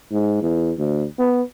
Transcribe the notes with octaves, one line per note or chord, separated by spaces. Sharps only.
G#2
E2
D2
B3